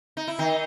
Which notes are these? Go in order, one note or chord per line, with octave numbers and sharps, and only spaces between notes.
D#4
E4
D#3 D#4